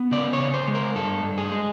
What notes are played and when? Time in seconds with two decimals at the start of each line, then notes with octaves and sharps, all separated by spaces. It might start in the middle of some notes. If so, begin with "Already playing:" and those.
Already playing: B3
0.11 C#3 D5
0.33 C#5
0.40 C#3
0.54 C5
0.68 G#3
0.75 A#4
0.95 G2 A4
1.23 G2
1.38 G#4
1.52 G#3